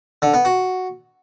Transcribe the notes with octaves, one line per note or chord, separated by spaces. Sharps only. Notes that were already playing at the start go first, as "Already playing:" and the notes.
D3
B3
F#4